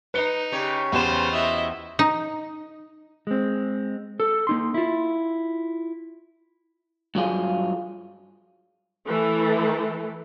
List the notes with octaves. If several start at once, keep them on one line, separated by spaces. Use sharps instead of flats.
D#4 B4 C#7 G7
C#3 G4 C#5
E2 C#3 F#3 F4 G4 B4 C5 E7
E4 F#4 D#5 E5
D#4
G#3 C4
A4
A#3 D#4 C6
E4 F4
G2 F#3 F4 G#4
E3 A3 A4